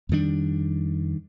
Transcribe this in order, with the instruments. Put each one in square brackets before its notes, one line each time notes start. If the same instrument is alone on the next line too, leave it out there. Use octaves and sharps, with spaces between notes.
[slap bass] F2 D#3 G3 D4